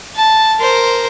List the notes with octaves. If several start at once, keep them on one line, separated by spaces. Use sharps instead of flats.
A5
A#4 C5